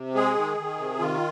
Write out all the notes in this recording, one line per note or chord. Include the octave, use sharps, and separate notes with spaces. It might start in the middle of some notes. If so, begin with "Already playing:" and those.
Already playing: C3
G#3 G#4
D#3
D#3
C3
D#3 F4